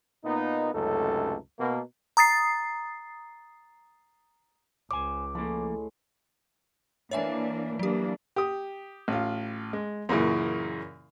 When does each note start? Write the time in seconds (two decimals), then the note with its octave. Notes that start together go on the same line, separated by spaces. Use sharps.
0.24 A#2 A#3 B3 D#4
0.74 C#2 F#2 C3 A3 D#4 A4
1.59 B2 A#3
2.17 A#5 D#6 A6 C7
4.91 C#2 C5 G#5 D6
5.35 A2 F3 G#3 A#3
7.11 E3 A#3 D4 C#5 E5 G#5
7.79 E3 F#3 A#3 D4 G4
8.36 G4 D#6
9.08 A1 F4
9.73 G#3
10.09 F#2 A#2 C#3 E3